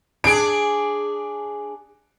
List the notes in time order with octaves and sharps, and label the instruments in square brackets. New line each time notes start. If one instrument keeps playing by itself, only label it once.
[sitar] D4 G#4 [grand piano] D7